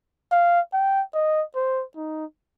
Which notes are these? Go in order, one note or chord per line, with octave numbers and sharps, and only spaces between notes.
F5
G5
D#5
C5
D#4